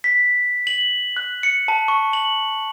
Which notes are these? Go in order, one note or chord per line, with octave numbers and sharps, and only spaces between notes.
B6
F#7
F#6
C#7
A5
C#6
F#7